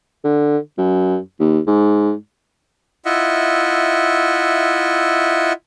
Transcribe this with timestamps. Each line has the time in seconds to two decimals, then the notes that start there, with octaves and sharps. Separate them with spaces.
0.24 D3
0.78 F#2
1.40 D#2
1.67 G#2
3.05 E4 F4 D#5 E5 F#5